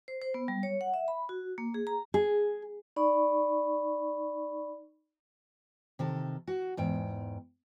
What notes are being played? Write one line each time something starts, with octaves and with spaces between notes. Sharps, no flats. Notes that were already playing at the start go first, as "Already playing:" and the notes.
C5
C5
B3
G3
C#5
F#5
E5
B5
F#4
A#3
G#4
A#5
G#4
D#4 D5 B5 C#6
C3 D#3 A4
F#4
E2 G#2 G5